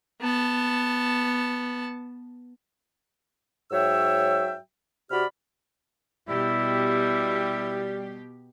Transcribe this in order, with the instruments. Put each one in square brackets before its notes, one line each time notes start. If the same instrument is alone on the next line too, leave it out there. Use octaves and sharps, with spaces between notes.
[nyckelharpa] B3 A5
[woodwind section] G#2 F#3 C#5 E5 G5 E6
C3 F#4 G4 D5 B5 F6
[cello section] B2 G4 [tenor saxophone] G3 [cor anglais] E4